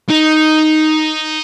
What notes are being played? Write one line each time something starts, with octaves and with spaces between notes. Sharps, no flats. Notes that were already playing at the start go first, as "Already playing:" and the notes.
D#4